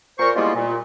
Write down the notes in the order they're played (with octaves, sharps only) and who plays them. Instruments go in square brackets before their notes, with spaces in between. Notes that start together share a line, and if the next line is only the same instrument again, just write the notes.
[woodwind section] A#2 A#4 C5 C#6
G3 G#3 A#3 B3 E4 F4
A#2